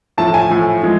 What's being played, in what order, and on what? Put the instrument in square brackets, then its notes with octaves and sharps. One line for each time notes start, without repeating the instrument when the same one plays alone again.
[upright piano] A2 F3 A3 A5
G#5
A2 F3 A3
F3 G#3